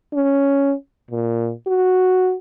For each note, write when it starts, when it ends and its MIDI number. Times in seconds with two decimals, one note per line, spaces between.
0.13 0.73 61
1.11 1.51 46
1.67 2.34 66